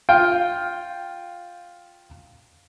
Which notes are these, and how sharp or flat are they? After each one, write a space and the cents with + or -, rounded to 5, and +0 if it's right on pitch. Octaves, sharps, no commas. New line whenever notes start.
F4 +5 G5 +0